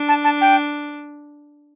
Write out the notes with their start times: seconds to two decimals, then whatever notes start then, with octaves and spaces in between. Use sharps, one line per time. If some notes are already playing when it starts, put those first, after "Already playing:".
Already playing: D4
0.09 A5
0.24 A5
0.41 G5